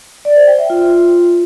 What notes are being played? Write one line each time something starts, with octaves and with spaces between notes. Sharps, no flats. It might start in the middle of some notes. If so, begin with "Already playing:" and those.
D5
C5
G5
E5
F4